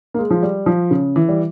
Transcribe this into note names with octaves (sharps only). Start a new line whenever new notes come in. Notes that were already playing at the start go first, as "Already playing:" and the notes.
A#3
G#3
F3
G3
F3
C#3
E3
G3